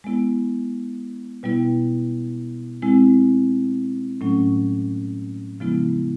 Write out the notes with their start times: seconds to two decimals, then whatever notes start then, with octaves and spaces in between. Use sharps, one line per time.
0.04 G#3 B3 E4
1.43 B2 G3 B3 E4
2.82 G#3 C4 E4
4.21 A2 F#3 A3 C#4
5.60 C#3 F3 G#3 B3 E4